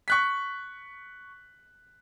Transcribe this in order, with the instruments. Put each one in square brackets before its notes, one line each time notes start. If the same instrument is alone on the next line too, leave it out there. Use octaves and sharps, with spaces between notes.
[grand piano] C#6 F#6 B6